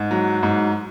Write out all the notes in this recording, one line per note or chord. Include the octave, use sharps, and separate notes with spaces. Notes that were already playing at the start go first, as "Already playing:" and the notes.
Already playing: G#2
F#3
G#2